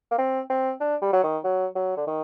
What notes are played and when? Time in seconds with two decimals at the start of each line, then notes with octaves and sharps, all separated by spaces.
0.11 A#3
0.18 C4
0.50 C4
0.81 D4
1.02 G3
1.13 F#3
1.23 D#3
1.44 F#3
1.75 F#3
1.97 D3
2.07 D#3